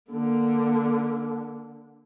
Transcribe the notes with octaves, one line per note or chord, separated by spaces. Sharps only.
D3 A#3